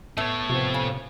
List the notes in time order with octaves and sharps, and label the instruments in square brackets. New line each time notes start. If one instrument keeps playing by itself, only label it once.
[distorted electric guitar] A2 C#5 [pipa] A3 [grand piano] B3
[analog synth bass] C3 [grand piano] F3 B3 C4
[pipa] C#3